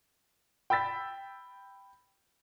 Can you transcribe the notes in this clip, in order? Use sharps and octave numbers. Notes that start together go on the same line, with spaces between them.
G5 B5 E6 A6 B6